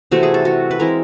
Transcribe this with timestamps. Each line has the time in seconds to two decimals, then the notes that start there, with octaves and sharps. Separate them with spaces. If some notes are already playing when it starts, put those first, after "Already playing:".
0.11 C3 E3 A3 C4 F#4
0.23 G#4
0.34 A4
0.45 F#4
0.71 B4
0.79 E3 G#3 C4 E4 A#4